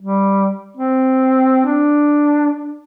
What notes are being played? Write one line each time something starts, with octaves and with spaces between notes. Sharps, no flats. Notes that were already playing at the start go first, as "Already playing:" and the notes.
G3
C4
D4